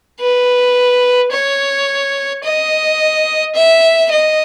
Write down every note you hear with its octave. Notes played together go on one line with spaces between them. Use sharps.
B4
C#5
D#5
E5
D#5